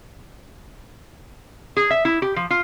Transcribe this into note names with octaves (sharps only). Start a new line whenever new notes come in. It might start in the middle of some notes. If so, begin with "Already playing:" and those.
G#4
E5
E4
G4
F3
F4